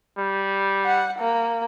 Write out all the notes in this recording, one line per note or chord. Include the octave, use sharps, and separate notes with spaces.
G3
F#5
A#3